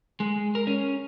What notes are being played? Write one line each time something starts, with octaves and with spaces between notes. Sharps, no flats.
G#3
A#4
C#4